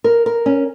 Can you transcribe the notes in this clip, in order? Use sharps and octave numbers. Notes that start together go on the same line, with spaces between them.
A#4
A#4
C#4